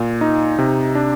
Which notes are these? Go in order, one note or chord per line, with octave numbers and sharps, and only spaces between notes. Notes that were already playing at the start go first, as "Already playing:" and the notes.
Already playing: A#2
D#4
C3
D4